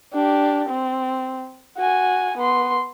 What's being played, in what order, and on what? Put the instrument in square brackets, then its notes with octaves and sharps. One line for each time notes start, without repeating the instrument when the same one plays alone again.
[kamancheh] D4 G4
C4
F#4 G#5
B3 C6